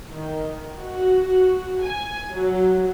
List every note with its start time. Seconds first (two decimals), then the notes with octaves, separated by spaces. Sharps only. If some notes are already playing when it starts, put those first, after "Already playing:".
0.11 D#3
0.77 F#4
1.84 G#5
2.33 F#3